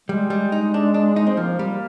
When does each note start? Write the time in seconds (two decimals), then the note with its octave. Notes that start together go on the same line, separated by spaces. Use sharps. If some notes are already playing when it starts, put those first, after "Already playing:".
0.09 G3 G#3
0.30 G3
0.52 D#4
0.74 D4
0.94 D4
1.16 D#4
1.27 C4
1.32 G#3
1.37 F3 A#3
1.59 G3